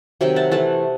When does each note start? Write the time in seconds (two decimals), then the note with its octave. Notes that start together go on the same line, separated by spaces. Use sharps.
0.21 C3 D#3 F#3 E5 G5
0.36 F#5 A5
0.51 E3 A3 F#5 A5